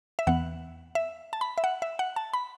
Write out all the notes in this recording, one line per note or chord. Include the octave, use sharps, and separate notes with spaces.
E5
E2 E3 B3 F#5
E5
A5
B5
E5
F#5
E5
F#5
A5
B5